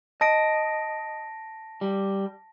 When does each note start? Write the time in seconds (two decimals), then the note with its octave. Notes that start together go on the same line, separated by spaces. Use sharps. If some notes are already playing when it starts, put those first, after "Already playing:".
0.21 D#5 A5 A#6 D7
1.81 G3